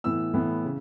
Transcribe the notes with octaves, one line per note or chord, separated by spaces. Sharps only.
A2 E3 B3 E4 E6
A2 E3 B3 E4
C#3